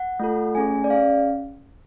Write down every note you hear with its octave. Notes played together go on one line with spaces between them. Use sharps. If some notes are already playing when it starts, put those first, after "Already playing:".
Already playing: F#5
A3 F4 A4
A3 C#4 G#4 G#5
D5
C#4 G#4 F5